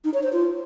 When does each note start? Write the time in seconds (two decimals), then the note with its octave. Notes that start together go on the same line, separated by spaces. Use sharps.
0.04 D#4
0.14 C#5
0.23 C5
0.33 F4